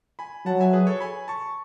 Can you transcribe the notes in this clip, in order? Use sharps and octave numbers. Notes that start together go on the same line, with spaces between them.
G#5 B5
F#3 F#5 A5
E5 G#5
G#4 B4
A4 C#5
G#5 B5
A5 C#6